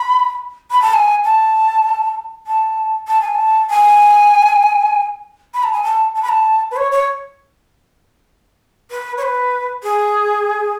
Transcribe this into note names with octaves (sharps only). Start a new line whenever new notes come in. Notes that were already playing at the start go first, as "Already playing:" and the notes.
Already playing: B5
B5
A5
G#5
A5
A5
A5
G#5
A5
G#5
B5
A5
G#5
A5
A5
B5
A5
B4
C#5
C#5
B4
C#5
B4
G#4